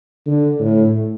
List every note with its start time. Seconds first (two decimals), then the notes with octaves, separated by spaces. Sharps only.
0.26 D3
0.59 A2